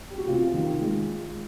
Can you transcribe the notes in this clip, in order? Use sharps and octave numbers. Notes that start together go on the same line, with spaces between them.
G4
F#4
C3 F4
D#3
G#3